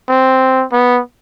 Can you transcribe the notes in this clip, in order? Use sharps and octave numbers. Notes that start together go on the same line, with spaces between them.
C4
B3